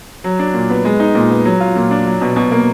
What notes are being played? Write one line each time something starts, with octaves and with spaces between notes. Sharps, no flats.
F#3
D4
A#2
B3
G#3
D#4
A#2
B3
F#3
F4
A#2
D4
F#3
B2
B2
A#3